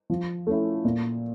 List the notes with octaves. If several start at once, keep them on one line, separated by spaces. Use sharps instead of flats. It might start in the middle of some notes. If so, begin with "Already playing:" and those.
F3
A3 C#4 E4
A#2